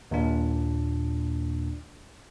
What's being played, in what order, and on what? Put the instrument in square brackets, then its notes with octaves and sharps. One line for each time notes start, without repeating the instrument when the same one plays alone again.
[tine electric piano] D#2 A#2 D4